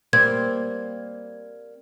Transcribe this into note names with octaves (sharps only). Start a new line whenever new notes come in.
G3 A#3 C4 G#6